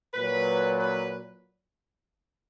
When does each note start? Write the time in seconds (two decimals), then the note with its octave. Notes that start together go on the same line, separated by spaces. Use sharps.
0.14 A#2 F#3 B4
0.78 B4